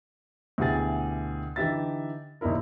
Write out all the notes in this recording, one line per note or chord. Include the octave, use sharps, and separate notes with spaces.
D2 B2 E4 G4 G#4 A6
D3 E3 D#4 G4 E5 A6
A#1 D#2 D#4 E4 A#4